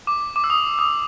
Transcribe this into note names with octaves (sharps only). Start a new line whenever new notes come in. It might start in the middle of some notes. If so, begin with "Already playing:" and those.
D6
D6
E6
D#6
D#6